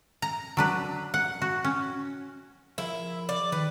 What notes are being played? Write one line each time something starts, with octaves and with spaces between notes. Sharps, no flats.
A#5
F#3 D4 B4
F#5
F#4
C#4
F3 E4 G#4 A#4
D5
D#3 B4